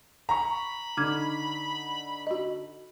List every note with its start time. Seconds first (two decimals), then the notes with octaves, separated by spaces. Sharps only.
0.29 A#5 B5 C#6
0.97 D3 D#4 D6 F6 G#6
2.27 F#4 D#5